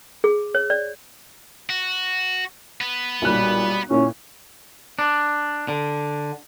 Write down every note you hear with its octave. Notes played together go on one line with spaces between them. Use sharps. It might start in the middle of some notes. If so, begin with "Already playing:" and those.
G#4
C#5
D5
F#4
B3 B4
B1 A#2 G3 F#6
A#2 C#4 E4
D4
D3